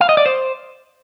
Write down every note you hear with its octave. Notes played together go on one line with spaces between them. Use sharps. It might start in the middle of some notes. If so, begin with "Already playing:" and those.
F5
D#5
D5
C5